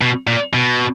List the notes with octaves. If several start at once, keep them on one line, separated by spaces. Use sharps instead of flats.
B2
A#2
B2